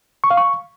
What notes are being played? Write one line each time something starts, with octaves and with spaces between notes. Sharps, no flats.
C#6
F5
C#6